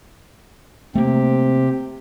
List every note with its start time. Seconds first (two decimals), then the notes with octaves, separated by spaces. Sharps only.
0.95 C3 A3 A#3 C4 G4